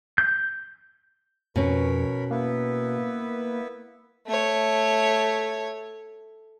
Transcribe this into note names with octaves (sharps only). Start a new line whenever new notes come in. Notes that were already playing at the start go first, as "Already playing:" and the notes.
G6
F2 B2 C#4 A#4 C#5 B5
A#3 B3 E4 B4
A3 C#5